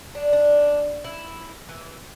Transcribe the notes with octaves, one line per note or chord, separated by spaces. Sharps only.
D4
D4
E4
E3